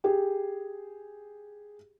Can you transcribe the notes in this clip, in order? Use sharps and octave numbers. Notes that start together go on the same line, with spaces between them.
G4 G#4